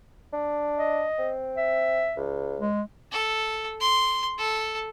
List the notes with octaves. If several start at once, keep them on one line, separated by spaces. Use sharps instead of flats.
D4
D#5
C4
E5
C#2
G#3
A4
C6
A4